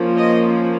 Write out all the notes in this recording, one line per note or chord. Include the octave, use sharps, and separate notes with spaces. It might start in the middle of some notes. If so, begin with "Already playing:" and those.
Already playing: F3 A#3 C#4
D#5